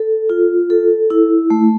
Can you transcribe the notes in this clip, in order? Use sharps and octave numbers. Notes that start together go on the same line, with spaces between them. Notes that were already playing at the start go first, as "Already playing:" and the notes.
Already playing: A4
F4
A4
E4
A3